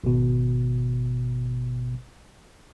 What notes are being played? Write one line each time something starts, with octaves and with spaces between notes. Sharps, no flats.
G#1 B2